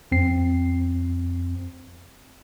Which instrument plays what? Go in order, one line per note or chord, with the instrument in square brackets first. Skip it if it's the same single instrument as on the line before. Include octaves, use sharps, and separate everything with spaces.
[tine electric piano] F2 C4 C7